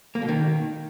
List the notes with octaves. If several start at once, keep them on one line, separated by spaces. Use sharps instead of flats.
A#3
B2
D#3